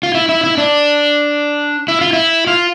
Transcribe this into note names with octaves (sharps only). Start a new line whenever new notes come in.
F4
E4
E4
E4
D4
E4
F4
E4
F4